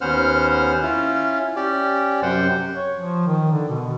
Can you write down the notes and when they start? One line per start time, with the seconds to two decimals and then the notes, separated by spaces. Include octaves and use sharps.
0.01 D#2 B3 C#4 C5 F#5 F6
0.83 C#4 E4 F4
1.56 C#4 G4 D5
2.22 F#2 C3 C5 F#5 G5
2.75 C#5
2.98 F3
3.27 D#3
3.52 D3
3.68 B2